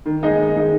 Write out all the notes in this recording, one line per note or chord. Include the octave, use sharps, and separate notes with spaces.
D#3
G#3 D#4 G#4 D#5
D#3
G#3 D#4 G#4 D#5